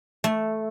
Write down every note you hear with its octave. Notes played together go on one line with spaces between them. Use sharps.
A3